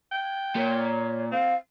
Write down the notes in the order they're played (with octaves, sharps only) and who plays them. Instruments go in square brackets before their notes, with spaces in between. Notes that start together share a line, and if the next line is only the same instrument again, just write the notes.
[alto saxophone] G5
[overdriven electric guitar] A#2 [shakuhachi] C#5
[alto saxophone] C4 [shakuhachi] F5